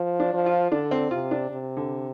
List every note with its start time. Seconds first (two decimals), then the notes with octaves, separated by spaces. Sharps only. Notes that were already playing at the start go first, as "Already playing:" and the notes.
Already playing: F3
0.20 D4
0.33 F3
0.46 F4
0.72 D3 D4
0.91 C4
1.11 C3 F4
1.31 D4
1.50 C3
1.77 D3